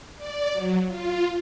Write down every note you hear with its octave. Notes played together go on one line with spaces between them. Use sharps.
D5
F#3
F4